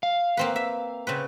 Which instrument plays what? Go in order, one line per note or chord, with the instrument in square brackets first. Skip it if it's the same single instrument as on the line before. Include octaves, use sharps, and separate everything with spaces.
[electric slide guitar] F5
[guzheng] A#3 C4 B4
E5
C#3 C4 B4